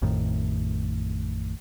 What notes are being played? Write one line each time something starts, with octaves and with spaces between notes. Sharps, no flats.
A1 F2 A2 D#3